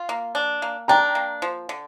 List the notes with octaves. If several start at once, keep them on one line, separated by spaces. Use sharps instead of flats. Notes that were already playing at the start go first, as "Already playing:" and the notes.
Already playing: F4
A#3
D4
A#3
D4 G5 A#5
A#3
F3
D3